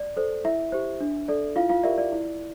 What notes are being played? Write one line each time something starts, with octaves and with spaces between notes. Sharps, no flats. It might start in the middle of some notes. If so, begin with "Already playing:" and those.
Already playing: D5
A4 C5
E4 E5
G4 C5
D4
A4 D5
E4 F4 F5
F4 F5
G4 A#4 D5 E5
D5
E4